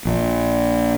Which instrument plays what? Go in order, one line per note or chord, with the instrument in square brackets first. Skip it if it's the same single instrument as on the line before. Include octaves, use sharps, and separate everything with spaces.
[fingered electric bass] A#1